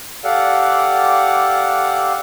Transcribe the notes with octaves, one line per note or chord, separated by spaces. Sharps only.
G4 A4 D5 F5 F#5